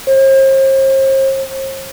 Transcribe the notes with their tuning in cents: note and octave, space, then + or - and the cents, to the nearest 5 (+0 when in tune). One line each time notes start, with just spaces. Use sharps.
C5 +40